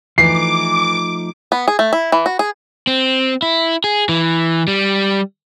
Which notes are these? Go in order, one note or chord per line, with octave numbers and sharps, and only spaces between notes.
E3 F3 A3 D#4 D6 C7
B3
G#4
A3
E4
E3
F#4
G#4
C4
E4
G#4
E3
G3